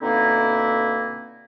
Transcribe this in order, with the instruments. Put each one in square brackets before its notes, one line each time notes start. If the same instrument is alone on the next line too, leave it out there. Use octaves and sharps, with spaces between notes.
[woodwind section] B2 D3 A#3 C4 D#4 E4